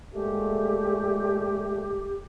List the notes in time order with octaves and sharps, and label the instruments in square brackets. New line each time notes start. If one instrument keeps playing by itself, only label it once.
[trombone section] A#2 G#3 A3 [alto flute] G4